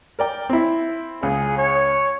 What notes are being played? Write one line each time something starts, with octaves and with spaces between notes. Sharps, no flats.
A#4 D5 G5
C4 E4
C#2 G#4
C#5